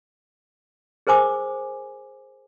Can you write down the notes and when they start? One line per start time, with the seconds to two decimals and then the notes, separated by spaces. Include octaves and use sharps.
1.07 G#4 A#4 C5 G#5 D6 D#6